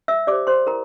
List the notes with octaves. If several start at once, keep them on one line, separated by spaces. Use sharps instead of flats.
E5 E6
G4 C5 D5 D6
C5 C6
E4 A#4 A#5